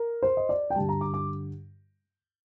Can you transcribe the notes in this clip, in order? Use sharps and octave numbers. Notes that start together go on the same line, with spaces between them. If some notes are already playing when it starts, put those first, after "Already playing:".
Already playing: A#4
C5
D#5
D5
G5
G2 D3 G3 A5
A#5
D6
D6